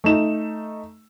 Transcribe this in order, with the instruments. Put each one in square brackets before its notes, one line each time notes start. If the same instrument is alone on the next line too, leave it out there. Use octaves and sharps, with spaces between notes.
[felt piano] A3 D#4 E7